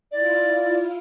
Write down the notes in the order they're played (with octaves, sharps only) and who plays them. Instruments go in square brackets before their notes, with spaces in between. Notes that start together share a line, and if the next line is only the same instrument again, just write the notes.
[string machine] E4 F4 [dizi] D5